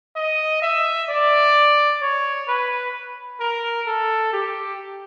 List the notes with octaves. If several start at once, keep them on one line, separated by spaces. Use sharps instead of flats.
D#5
E5
D5
C#5
B4
A#4
A4
G4